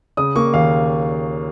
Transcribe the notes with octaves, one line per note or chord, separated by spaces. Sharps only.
C#3 D#6
A#3 C#6
D#2 F5